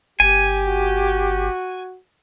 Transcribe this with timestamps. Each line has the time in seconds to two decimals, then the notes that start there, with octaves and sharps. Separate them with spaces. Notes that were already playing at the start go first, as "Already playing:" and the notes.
0.20 G1 G4 G#5
0.65 F#4